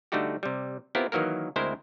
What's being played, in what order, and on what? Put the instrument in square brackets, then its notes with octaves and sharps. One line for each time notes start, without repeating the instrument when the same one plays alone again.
[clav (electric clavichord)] D3 G3 A3 D#4 F#4 G4
C3 G3
B3 C4 E4 F4 G4 A#4
D#3 E3 F#3 A#3 A#4
D2 G#3 C4 E4 A#4 C5